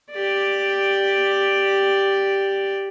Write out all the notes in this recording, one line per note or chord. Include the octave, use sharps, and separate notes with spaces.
G4 D5